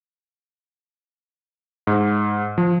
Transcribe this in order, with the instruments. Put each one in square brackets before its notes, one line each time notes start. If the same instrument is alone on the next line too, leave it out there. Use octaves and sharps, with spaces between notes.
[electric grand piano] G#2
F3